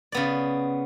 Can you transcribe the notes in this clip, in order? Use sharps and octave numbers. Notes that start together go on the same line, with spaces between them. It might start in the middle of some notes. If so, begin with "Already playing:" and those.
C#3 B3 D5